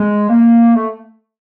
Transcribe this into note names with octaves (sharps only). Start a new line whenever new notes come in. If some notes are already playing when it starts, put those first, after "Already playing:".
Already playing: G#3
A#3
A3